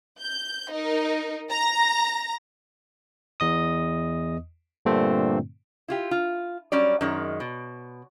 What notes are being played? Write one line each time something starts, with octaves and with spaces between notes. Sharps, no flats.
G6
D#4 A#4
A#5 A#6
E2 D#5 D#6
G2 A#2 D3 A3 C4
E4 F4 G4
F4
F#3 G3 C#4 D5
F#2 D#3 G#3
B2